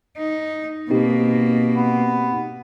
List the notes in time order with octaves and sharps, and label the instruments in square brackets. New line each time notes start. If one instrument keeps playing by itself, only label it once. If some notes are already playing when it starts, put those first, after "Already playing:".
[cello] D#4
[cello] B2 A#3 [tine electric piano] C4 D#4 G4
[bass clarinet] B3